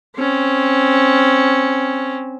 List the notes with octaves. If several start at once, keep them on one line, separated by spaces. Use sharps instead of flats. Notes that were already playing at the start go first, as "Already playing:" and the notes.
C4 C#4